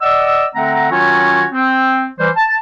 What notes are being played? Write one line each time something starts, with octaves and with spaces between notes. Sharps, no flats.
D5 D#5 F#5 E6
D3 A3 C4 F#5 A#5
D#3 F#3 C#4 F4 F#4 C#5
C4
E3 G3 C5
A5